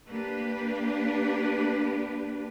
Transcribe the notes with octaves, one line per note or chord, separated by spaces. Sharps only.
A#3 D4 G4 B4